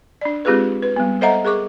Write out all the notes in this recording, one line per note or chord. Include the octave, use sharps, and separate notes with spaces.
D4 D5
G#3 C4 F4 G4 G#4 B4
B4
G3 B3
A4 C5 D#5 E5 F#5 A#5
G#4 A#4 C#6 D6